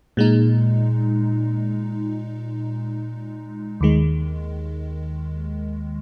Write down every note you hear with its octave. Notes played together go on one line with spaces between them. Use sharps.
A#2 G#3 D#4
D#2 D#3 G#3